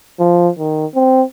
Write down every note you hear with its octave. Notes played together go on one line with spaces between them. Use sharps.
F3
D#3
C4